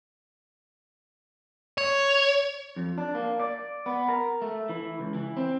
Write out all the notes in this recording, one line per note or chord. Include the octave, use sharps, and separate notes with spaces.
C#5
F2
D4
A#3
D5
B3
A#4
A3
E3
C#2
E3
C4